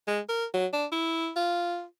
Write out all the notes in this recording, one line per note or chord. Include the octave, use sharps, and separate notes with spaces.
G#3
A#4
F#3
D4
E4
F4